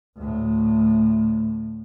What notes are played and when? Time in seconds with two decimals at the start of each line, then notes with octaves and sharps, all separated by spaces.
0.17 D2 A2